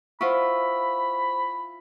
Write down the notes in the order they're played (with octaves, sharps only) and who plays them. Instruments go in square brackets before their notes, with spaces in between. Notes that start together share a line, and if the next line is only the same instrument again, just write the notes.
[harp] E4 F4 [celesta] C5 F#5 C#6 [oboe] B5